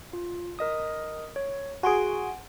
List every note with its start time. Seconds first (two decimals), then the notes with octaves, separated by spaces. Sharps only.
0.13 F4
0.59 A#4 D#5 D#6
1.36 C#5
1.83 F#4 G#4 G#5 C6 D7